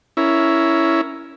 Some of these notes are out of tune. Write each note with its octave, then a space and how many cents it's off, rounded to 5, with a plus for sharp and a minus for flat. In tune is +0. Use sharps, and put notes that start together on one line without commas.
C#4 +10 E4 +0 A#4 +0